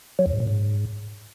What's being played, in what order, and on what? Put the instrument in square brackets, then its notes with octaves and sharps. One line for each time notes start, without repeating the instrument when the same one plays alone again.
[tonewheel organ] F#3
E2
G#2
A#2
G#2